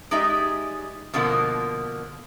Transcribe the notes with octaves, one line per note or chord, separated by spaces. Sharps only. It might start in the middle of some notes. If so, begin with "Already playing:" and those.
G#3 D#4 G4 D5 E5
B2 D3 F3 A#3 B3